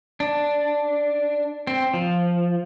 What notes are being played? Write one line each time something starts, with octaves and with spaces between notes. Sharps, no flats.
D4
C4
F3